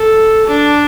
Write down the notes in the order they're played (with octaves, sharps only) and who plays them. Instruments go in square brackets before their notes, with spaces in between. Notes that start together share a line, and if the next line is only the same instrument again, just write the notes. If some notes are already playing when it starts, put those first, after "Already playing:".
Already playing: [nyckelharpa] A4
D4